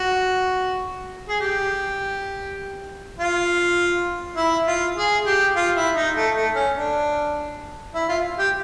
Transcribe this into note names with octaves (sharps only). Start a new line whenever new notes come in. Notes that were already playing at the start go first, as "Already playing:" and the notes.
Already playing: F#4
G#4
G4
F4
E4
F4
G#4
G4
F4
E4
D#4
A3
A3
C#4
D4
E4
F4
G4